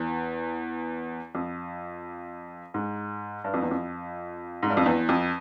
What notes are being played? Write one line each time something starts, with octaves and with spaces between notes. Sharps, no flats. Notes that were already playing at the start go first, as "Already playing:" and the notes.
Already playing: E2
F2
G#2
G2
F2
E2
F2
G#2
G2
F2
E2
F2